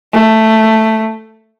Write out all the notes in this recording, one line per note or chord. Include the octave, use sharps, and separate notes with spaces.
A3